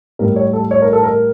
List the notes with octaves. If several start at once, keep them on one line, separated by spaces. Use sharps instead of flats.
A2 G3 A#4
C#5
A4
C#5
A#4
A4
A#4